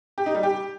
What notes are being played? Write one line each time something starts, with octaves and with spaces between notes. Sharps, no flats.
G4
D#4
G3
G4